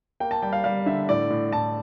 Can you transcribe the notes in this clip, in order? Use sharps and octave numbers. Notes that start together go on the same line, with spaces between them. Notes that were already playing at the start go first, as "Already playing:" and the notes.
A#3 G5
A5
G3 G5
F5
G3 F5
D3 E5
A2 D5
A2
A2 A5